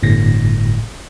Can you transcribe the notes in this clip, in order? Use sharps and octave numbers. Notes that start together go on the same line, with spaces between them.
G1 A2 A#6